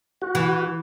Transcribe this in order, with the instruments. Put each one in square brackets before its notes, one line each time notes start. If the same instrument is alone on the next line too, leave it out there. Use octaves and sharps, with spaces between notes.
[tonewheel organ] F#4
[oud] E3